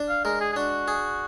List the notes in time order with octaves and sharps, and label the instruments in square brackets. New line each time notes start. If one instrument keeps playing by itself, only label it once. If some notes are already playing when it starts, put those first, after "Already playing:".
Already playing: [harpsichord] D4
[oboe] F5
[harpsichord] G#3 [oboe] A#4
[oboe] G#4
G#4
[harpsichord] D4 [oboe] F#4
[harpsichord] G#4